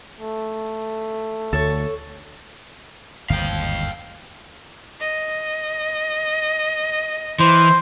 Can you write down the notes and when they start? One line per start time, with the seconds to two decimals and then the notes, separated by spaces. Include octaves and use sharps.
0.21 A3
1.53 D2 A4 C#5
3.30 G1 D#2 G#2 F5 G5
5.00 D#5
7.40 E3 C5